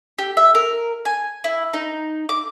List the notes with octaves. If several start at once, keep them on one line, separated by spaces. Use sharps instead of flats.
G4
E5
A#4
G#5
E4
D#4
D6